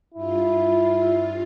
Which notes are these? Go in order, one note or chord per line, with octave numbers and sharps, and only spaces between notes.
G2 E4 F4